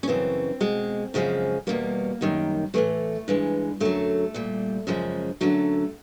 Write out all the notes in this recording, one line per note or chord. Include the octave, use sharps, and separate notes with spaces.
C#4
F#2 C#3 E3 C4
B2 G#3
F#2 C#3 F3 G#3
E2 B2 G3 A#3
F#2 D#3 G3
A2 E3 G#3 A3
G2 E3 G#3
F#2 D3 F#3 A3
A#2 G3
F#2 C#3 F3 G#3
F#2 D3 F#3 A3